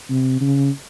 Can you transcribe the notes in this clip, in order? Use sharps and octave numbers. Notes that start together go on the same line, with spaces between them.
C3
C#3